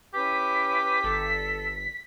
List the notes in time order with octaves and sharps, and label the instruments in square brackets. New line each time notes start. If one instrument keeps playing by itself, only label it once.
[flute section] C#4 E4 B4 [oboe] G4 [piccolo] B6
[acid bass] G1 [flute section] A4